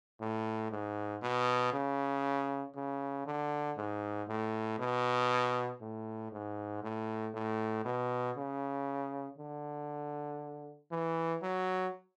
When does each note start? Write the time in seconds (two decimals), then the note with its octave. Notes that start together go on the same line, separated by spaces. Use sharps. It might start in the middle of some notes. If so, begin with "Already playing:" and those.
0.21 A2
0.71 G#2
1.22 B2
1.73 C#3
2.76 C#3
3.26 D3
3.77 G#2
4.28 A2
4.79 B2
5.81 A2
6.32 G#2
6.83 A2
7.34 A2
7.85 B2
8.37 C#3
9.38 D3
10.91 E3
11.42 F#3